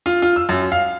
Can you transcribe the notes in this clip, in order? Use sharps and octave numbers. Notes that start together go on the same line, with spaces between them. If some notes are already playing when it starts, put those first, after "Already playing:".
F4
F4
E6
F#2
F5